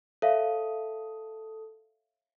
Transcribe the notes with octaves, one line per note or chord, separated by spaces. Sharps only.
A4 C#5 E5 F5